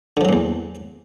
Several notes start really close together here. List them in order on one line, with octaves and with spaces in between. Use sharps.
D3 F3 F#3 A#2 E2